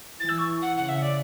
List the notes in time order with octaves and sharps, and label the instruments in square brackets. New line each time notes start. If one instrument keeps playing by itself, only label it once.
[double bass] E3 [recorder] A6
[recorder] E6
C#6
F#5
[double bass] C#3 [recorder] F#5
[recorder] E5
D5